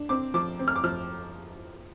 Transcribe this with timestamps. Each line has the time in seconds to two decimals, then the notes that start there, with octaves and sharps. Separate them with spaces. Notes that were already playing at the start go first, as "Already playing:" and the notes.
Already playing: D4
0.09 C4 D6
0.34 F3 D6
0.59 C4
0.68 F6
0.76 D6
0.83 F3 F6